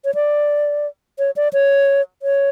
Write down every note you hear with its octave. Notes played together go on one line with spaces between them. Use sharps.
C#5
D5
C#5
D5
C#5
C#5